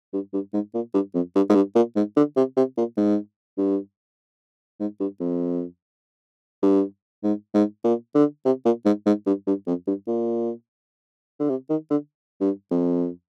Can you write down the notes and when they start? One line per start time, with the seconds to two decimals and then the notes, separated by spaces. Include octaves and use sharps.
0.13 G2
0.33 G2
0.53 G#2
0.74 A#2
0.94 G2
1.14 F2
1.35 G2
1.49 G#2
1.55 G2
1.75 A#2
1.96 G#2
2.16 D3
2.36 C3
2.57 C3
2.77 A#2
2.97 G#2
3.58 G2
4.80 G#2
5.00 G2
5.20 F2
6.62 G2
7.23 G#2
7.54 G#2
7.84 A#2
8.15 D3
8.45 C3
8.65 A#2
8.85 G#2
9.06 G#2
9.26 G2
9.47 G2
9.67 F2
9.87 G2
10.07 A#2
11.40 D3
11.49 C3
11.69 D#3
11.90 D3
12.41 G2
12.71 F2